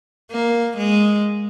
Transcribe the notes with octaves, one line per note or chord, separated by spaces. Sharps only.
A#3
G#3